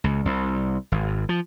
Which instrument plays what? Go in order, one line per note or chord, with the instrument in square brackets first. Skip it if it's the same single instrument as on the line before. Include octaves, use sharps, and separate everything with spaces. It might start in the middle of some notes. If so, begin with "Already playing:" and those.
[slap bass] C#2
C2
G#1
F3